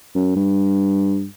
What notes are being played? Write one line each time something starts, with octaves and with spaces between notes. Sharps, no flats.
F#2
G2